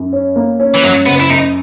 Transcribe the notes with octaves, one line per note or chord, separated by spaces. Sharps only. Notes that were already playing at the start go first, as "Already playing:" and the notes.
Already playing: F#2
C#4
A#3
C#4
E3
F#2 F#3
F#1 B3
E4
F#2 D#4